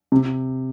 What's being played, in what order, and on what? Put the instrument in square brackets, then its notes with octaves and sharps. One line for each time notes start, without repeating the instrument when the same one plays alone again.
[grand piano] C3